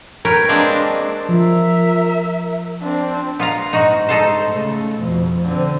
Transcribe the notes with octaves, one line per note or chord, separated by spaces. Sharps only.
A#4 B4 C#5 G5
G#3 A#3 C4 D4
F3 A#4 E5
C4 D4
B3 F4 A#5
G#2 D#4 F#4
D#4 A4 C5
C#3 A3
F2 B2
D3 C4